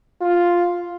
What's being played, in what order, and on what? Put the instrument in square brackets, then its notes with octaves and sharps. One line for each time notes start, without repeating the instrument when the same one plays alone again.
[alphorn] F4